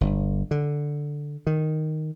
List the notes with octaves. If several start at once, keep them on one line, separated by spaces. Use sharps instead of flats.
G1
D3
D#3